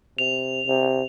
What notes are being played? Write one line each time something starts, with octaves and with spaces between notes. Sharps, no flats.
C3 F7
C3